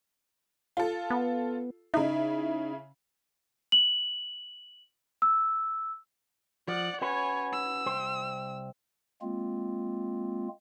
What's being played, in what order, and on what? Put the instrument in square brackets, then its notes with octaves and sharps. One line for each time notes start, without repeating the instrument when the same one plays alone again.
[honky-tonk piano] F4 A4
[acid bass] B3
[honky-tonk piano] C#3 E4 [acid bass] D#4
[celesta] F#7
E6
[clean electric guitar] F3 [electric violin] D5 F#5
[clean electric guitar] C#4 F#4 B4 [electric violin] C#5 G#5
[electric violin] E6
[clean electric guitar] C2 G4 C5
[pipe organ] G#3 A#3 C4 F4